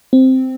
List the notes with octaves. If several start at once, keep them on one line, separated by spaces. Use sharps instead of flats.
C4